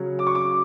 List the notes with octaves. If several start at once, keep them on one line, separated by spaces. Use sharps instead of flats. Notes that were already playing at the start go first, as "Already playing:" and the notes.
Already playing: C#3 F#3 C#4
D6
C#6
D6